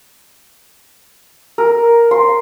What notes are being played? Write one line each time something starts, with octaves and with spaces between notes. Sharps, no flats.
A#4
C6